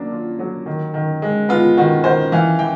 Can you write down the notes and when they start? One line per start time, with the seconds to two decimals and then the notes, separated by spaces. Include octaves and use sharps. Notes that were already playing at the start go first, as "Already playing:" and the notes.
Already playing: F#3 A#3 D4
0.12 F4
0.39 F#3
0.66 D#3
0.94 D#3
1.22 G#3
1.49 B3 F4
1.77 D#3 F#4
2.04 D#3 C5
2.32 E3 F5
2.59 E3 G5